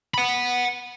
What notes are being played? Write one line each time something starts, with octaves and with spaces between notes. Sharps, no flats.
F#5 B5